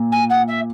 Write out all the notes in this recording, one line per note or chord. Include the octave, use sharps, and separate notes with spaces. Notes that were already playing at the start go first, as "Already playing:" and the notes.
Already playing: A#2
G#5
F#5
E5